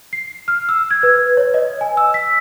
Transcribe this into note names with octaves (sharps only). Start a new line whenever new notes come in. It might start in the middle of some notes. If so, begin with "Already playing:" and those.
C7
F6
E6
G#6
B4
C#5
D#5
G#5
E6
B6